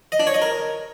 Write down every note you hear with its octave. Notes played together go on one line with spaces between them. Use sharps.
D#5
D4
C#5
D#5
A#4